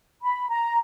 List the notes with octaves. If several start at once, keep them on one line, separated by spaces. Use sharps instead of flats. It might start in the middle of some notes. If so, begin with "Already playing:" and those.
B5
A#5